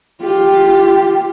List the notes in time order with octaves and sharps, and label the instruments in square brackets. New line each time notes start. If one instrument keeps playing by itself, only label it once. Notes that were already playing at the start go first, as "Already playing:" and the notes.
[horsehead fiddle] F4 G4